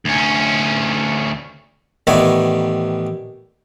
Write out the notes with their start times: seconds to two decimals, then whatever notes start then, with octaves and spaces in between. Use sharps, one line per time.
0.05 D2 C#4
2.07 A1 D#3 B3 C#5 D5 E5